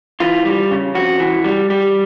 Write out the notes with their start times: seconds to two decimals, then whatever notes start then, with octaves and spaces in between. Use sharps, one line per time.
0.20 E3 F4
0.45 G3
0.71 C#3
0.95 F2 F#4
1.20 E3
1.44 G3
1.70 G3